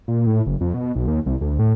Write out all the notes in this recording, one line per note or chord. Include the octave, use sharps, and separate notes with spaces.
A#2
A2
F#1
F2
B2
B1
D#2
C2
D2
A2